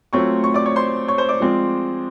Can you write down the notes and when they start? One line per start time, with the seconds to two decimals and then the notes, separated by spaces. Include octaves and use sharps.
0.13 F#3 A3 C4 F4 C#5 C#6
0.44 C#5 C#6
0.54 D5 D6
0.66 C#5 C#6
0.76 C5 C6
1.08 C#5 C#6
1.18 C5 C6
1.29 D5 D6
1.40 F3 G#3 C4 F4